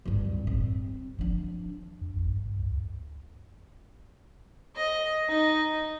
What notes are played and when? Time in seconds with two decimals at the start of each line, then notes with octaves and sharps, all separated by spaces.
0.06 D1 G2
0.47 G2 C4
1.19 F3 D4
2.01 F2
2.16 A1
2.29 G2
2.45 G2
2.59 C#2
4.76 D#5
5.29 D#4